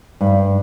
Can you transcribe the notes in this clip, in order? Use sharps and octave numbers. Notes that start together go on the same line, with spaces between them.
G2